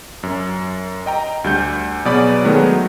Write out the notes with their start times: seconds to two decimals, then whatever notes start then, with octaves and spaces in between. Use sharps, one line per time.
0.23 F#2
1.06 D#5 G5 A#5
1.44 D2 G3 G6
2.05 B2 F#3 B3 G#4 D5 B5
2.45 D#3 F#3 G#3 A3 B3